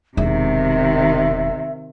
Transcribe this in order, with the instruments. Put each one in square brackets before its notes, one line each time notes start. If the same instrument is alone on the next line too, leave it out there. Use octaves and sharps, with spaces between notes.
[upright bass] E1 [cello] C3 D#3 [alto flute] E5